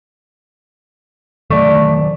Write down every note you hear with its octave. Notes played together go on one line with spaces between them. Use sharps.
D#3 F#3 G3 A3 D5